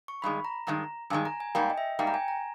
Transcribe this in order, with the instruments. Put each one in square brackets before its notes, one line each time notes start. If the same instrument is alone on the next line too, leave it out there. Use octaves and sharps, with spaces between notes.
[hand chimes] C#6
[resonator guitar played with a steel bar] G2 D#3 G#3 [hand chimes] B5
[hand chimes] A#5
[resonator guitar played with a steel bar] G2 D#3 G#3 [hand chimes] A#5
[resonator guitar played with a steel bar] G2 D#3 G#3 [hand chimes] G#5
[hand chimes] A#5
G#5
[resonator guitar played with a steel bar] G#2 G3 A#3 [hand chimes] G5
[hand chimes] D#5
E5
[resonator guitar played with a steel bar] G#2 G3 A#3 [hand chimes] G5
[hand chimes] A#5
G#5
A#5